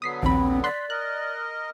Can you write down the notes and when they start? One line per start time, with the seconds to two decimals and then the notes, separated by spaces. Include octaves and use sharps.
0.02 D3 F#3 B3 D#6 B6 C7
0.23 A#1 D#2 C4 B5
0.64 D5 C6 F#6 B6
0.90 A#4 D#5 F#6